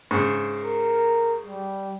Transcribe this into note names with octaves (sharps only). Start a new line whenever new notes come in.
G#2 C#3
A#4
G3